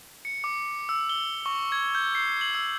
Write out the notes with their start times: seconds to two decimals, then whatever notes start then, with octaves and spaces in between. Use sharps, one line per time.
0.25 C#7
0.44 D6
0.89 E6
1.10 G7
1.46 C#6
1.72 G#6
1.95 G6
2.15 C7
2.41 F#7
2.55 E6